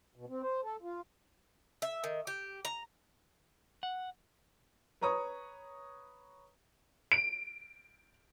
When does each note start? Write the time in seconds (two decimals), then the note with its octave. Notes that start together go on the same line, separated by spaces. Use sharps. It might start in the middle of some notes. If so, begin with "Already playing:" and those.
0.16 B2
0.29 C4
0.42 C5
0.63 A4
0.82 F4
1.82 E5
2.04 D#3
2.27 G4
2.65 A#5
3.83 F#5
5.01 B4 C#5 A#5 C#6 D#6
7.12 D7